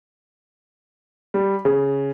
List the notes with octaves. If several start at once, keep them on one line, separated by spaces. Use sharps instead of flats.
G3
C#3